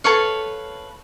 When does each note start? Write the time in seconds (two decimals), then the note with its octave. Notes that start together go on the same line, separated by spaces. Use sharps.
0.04 A4 B4 C#5 F5